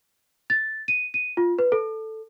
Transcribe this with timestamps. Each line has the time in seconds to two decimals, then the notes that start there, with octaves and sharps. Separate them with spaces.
0.50 A6
0.88 D#7
1.14 D#7
1.37 F4
1.59 B4
1.72 A4